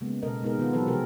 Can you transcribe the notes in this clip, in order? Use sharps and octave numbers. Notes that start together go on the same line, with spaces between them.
C#3 G#3 A#3 B3
B2 A4 A#4 D#5
G#3 B3 D#4 G#4 A#4
D#3 B3 F4
E3 F#3 B3 C4 A4 B4
C3 F3 G#4 A#4